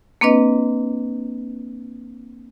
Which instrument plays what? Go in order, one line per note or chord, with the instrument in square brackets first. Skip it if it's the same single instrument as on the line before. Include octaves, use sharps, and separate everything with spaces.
[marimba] A#3 C4 D4 B4 D#5